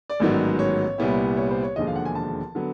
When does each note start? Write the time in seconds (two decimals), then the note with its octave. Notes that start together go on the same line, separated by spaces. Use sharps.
0.10 D5
0.20 A1 G#2 D#3 F#3 B3
0.59 C#5
0.98 C2 A#2 G3 B3 E4
1.37 C#5
1.51 C5
1.63 C#5
1.76 E1 D#2 D3 F3 G#3 D#5
1.87 F5
1.96 F#5
2.05 G#5
2.15 A5
2.55 D3 F#3 B3